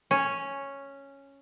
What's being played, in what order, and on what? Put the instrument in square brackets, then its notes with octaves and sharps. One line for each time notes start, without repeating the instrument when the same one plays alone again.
[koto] C#4